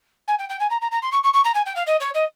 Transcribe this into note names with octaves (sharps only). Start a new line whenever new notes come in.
G#5
G5
G5
G#5
A#5
A#5
A#5
C6
C#6
C#6
C#6
A#5
G#5
G5
F5
D#5
C#5
D#5